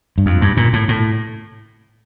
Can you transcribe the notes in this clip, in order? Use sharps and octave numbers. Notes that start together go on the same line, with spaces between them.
G2
F2
G2
A#2
A2
A2